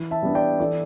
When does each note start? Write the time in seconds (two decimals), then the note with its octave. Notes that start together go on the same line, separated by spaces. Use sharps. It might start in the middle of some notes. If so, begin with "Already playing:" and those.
Already playing: E3
0.11 E5 A5
0.22 G3 B3 D4
0.35 D5 G5
0.59 E3 A4 D5